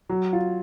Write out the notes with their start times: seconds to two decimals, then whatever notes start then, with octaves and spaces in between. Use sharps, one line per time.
0.09 F#3
0.33 F4